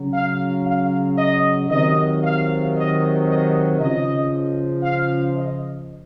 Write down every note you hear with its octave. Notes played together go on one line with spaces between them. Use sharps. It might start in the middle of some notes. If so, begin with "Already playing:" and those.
Already playing: C#3 F#3
F5
F5
D#5
C3 D#3 F#3 D#5
F5
D#5
D#5
C#3 F3 D#5
F5
D#5